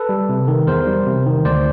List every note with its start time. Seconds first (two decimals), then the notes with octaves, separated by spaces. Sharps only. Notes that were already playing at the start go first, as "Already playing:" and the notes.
Already playing: A4 B4
0.09 G3
0.29 C3
0.48 D#3
0.67 E2 A#4 C5
0.87 G3
1.06 C3
1.26 D#3
1.45 D2 C5 D5